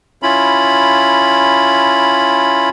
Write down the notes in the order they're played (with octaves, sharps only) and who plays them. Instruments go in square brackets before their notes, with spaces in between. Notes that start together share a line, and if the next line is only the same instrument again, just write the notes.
[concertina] C#4 E4 F4 B5